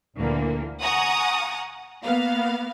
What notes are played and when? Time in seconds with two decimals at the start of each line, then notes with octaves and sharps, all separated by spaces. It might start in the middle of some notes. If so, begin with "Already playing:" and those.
0.17 D2 A#2 D3 E3 A#3
0.81 F#5 G#5 A#5 C#6 D#6
2.04 A#3 B3 F5